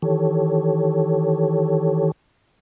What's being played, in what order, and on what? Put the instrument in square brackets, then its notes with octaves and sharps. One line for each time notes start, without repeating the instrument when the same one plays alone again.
[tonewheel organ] D#3 E3 G4 A4 C#5